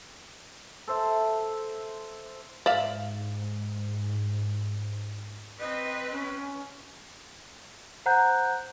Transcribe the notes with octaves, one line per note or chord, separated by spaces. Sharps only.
A4 C5 E5
G#2 D5 E5 F5
C4 B4 D#5
C#4
C5 F#5 A#5 F#6 G6